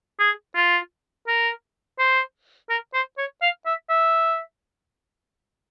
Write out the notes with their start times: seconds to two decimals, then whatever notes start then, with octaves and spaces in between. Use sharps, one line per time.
0.20 G#4
0.55 F4
1.27 A#4
1.99 C5
2.70 A#4
2.94 C5
3.18 C#5
3.42 F5
3.66 E5
3.90 E5